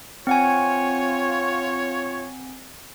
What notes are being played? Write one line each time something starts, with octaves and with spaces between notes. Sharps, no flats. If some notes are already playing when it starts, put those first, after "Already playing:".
C4 F4 C#5 F#5 G#5